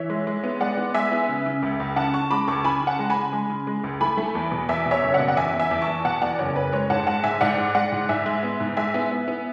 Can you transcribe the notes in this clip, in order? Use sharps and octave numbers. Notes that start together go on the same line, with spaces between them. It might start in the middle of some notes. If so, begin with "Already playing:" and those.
Already playing: E3 C#5 E5
G#3
G#3
B3
G#3 D5 F#5
B3
G#3 E5 G#5
B3
C#3
C#3
C#2
C#2
C#3 F#5 A5
C#3 A5 C#6
G#3 B5 D6
C#2 A5 C#6
C#3 G#5 B5
C#3
F#5 A5
G#3
G#5 B5
C#3
G#3
C#3
G#3
C#2
A3 G#5 B5
A3
E2
B2
E2 E5 G#5
B2
C#5 E5
F#1
D5 F#5
B2
F#5
E2 E5 G#5
E2
E5 G#5
E2
A5 C#6
E2
B2 F#5 A5
E2 D5 F#5
F#1 C#5
F#1 B4
G#3 C#5
G#2 F#5 A5
G#3 F#5 A5
G#2 E5 G#5
G#2 D5 F#5
G#3
G#3 D5 F#5
G#2
G#2 E5 G#5
G#3
B3
G#2
G#3 E5 G#5
B3
B3
B3